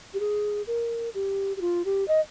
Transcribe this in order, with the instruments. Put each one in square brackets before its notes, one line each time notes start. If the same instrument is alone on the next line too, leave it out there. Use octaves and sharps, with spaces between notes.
[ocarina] G4
G#4
A#4
G4
G4
F4
G4
D#5